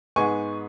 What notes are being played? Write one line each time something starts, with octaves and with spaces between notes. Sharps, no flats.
G#2 G#3 B3 G#5 C#6